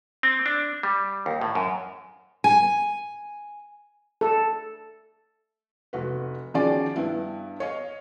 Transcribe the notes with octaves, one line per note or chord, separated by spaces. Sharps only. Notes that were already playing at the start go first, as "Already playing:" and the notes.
C4
D4
G3
D#2
A2
F#2
G#5
A4
F1 F#4 B4
D#3 F3 C#4 F#4 G#4 D5
G2 B3 E4
C#5 D#5 F5